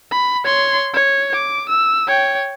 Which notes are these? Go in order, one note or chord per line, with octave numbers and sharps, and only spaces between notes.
B5
C#5 C6
C#5
D6
E6
C#5 G5